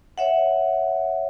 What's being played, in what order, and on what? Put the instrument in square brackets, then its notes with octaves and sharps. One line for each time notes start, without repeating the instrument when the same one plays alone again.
[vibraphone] C#5 E5 F#5